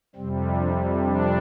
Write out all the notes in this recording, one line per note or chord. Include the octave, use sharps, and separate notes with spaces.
F2 C3 G3 C4
D4
D4